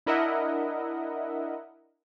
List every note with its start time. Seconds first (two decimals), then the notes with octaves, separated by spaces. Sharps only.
0.07 D4 E4 A#4 D#5 E5 F#5